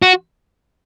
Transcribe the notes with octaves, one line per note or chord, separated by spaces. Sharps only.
F#4